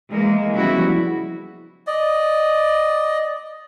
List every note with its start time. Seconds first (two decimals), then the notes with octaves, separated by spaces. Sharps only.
0.11 E3 G#3 A#3
0.54 C#3 F3 G3 B3 E4 F#4
1.87 D5 D#5